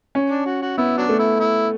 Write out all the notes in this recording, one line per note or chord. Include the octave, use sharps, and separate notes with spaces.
C#4
D4
F#4
F#4
B3 E4
F#3 D4
A3
E4
E4